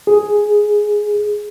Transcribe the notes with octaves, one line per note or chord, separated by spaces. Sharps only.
G#4